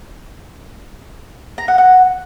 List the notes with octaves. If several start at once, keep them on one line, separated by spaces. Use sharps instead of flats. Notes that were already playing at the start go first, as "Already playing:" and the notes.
A#5
F#5
F#5